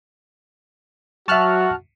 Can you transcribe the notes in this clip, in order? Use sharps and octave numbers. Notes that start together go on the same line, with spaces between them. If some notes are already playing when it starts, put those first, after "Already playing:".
F#3 F#4 E5 A5 C#6 F6 F#6